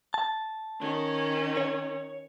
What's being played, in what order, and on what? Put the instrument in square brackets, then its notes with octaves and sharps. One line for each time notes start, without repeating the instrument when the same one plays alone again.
[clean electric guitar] A5
[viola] D#3 C#4
[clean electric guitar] C#5